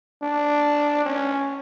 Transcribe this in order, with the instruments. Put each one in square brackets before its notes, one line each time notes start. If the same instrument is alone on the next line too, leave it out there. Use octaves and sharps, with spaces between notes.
[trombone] D4
C#4